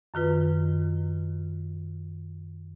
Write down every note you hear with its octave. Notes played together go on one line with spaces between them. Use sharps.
F#2 D#3 F4 B4